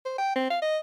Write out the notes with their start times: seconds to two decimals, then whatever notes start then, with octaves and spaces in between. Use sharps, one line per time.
0.05 C5
0.18 G5
0.36 C4
0.50 F5
0.62 D#5